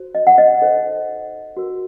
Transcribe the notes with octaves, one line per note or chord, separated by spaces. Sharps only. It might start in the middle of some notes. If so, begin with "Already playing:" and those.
Already playing: F#4 C5
D#5
F#5
D#5
D#4 A4 C5
F#4 A#4